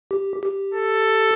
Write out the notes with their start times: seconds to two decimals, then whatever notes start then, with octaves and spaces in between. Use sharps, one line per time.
0.11 G4
0.43 G4
0.74 A4